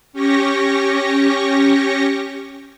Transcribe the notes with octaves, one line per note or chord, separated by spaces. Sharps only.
C#4 G4 C#6 A#6